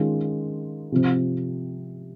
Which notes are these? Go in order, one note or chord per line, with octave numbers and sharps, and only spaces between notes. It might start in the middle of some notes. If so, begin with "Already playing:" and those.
Already playing: D#3 G#3 C#4 F4
C3 F3 C4